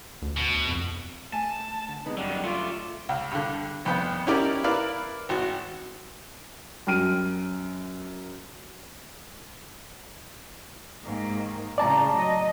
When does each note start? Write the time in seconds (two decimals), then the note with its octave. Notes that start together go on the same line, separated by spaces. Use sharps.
0.22 D2
0.38 B2
0.67 F2
1.33 A3 G#5 A5
1.89 D3
2.06 C3 G#3 B3 D#4
2.17 F#2 D3 D#3 G3
2.44 A3 F4 D5
3.09 C#2
3.31 G2 D3
3.85 G#1 F2 B3 G5
4.27 C#4 D#4 E4 G4 A#4 D5
4.64 E4 A#4 B4 D5 F5
5.29 G#1 F#4
6.87 F#2 G5 F6 D7 D#7
11.03 G#2 D#3 A#3
11.78 A2 C#3 D5 A5 A#5
12.16 F#3 D#5